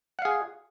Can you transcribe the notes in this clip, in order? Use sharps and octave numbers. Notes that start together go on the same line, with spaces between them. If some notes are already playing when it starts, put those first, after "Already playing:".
G#4 F5 F#5